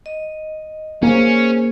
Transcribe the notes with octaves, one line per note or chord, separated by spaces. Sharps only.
D#5
A#3 C#4 G#4 C5